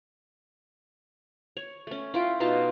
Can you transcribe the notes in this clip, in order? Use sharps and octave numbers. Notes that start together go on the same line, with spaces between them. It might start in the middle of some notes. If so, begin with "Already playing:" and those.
C#5
A3 C#4
E4 F4 G5
B2 D#4 F4 A5